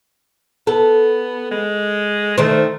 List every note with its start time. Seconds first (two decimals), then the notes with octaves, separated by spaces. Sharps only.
0.67 B3 A4
1.51 G#3
2.38 D#3 A3 C5